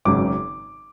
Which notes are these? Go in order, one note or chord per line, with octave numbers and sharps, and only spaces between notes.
G#1 F#2 C#3 F#3 D6